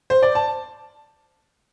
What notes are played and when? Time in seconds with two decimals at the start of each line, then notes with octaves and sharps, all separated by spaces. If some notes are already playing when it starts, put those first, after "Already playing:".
0.10 C5
0.23 D5
0.35 A5